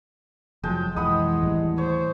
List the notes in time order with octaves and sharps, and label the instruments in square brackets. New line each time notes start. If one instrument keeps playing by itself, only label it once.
[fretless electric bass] F1 A#2 F#3 [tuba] F3 [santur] G#3 G5 A5
[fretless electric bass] B1 F2 [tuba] E3 [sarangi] G#3 [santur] F#5 B5 D#6
[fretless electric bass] D#2 A2 G3
[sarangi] C5 [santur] C#5